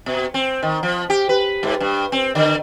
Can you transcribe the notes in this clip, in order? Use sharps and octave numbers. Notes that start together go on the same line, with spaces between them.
B2
C4
D#3
F3
G4
B4
G#2
G2
C4
D3